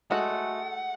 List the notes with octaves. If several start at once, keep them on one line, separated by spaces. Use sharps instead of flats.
G#3 A3 F#4 F#5